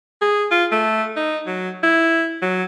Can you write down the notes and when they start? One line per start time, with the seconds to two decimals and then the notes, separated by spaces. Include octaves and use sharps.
0.21 G#4
0.51 F4
0.71 A3
1.16 D#4
1.47 F#3
1.83 E4
2.42 F#3